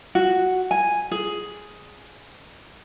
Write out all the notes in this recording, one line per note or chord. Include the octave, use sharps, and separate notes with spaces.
F#4
G#5
G#4